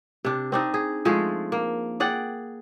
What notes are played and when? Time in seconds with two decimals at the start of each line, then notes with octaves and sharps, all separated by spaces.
0.25 C3 D4
0.52 C4 D4 D#4
0.74 G#4
1.05 F3 G#3 A3 G#4
1.52 A#3
2.00 G#4 D5 F#5 G5